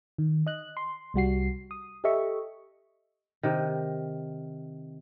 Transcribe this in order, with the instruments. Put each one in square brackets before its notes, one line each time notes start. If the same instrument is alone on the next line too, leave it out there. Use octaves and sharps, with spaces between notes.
[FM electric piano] D#3
D#5 F#6
C6
C2 G3 F#4 C7
D#6
G4 A4 D#5 E5 C#6
[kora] C3 D#3